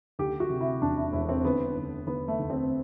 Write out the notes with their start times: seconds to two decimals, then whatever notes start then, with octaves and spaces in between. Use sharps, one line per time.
0.19 D2 G4
0.40 F#4
0.50 C3
0.60 E4
0.82 E1 D4
0.97 E4
1.13 E1 E4
1.29 C4
1.45 D3 B3
1.76 D2
2.07 D3 B3
2.28 A3
2.39 D2
2.50 C4